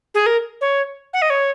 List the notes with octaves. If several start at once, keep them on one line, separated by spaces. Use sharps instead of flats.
G#4
A#4
C#5
F#5
D#5
C#5